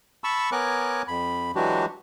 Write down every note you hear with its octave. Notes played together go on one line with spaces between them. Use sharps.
A5 B5 C#6 E6
B3 A#4 C#5 G#5 D6 F#6
F2 B5
E3 F#3 G#3 D4 F#4 G4